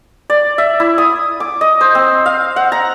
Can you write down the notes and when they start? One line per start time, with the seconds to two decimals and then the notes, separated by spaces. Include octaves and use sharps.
0.30 D5
0.58 E5
0.80 E4
0.98 D#6
1.40 D6
1.61 D#5
1.81 C5
1.95 C4
2.26 F5
2.56 F#5
2.72 A#5